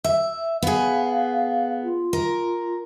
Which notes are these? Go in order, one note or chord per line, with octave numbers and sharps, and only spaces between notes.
E5
B3 G#4 F5
F4
A#4